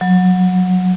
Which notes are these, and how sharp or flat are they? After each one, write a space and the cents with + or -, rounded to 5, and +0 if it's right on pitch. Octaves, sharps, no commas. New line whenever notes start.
F#3 -15